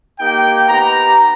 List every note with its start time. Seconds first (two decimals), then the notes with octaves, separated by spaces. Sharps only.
0.20 A#3 D#4 G4 G5
0.67 B3 D#4 G4 A#5